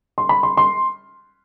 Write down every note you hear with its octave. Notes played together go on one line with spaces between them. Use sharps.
C6
B5
C6
C6